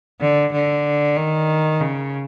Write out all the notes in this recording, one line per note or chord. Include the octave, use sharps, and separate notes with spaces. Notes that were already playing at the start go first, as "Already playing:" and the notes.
D3
D3
D#3
C#3